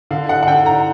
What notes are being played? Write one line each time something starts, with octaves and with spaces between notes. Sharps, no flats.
D3 F5
F#5
F#5
D3 G5
A#5